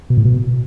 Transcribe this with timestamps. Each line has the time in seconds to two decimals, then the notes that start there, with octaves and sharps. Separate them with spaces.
0.10 B2
0.18 A2
0.25 B2